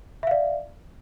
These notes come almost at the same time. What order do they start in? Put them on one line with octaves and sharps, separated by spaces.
E5 F5 D5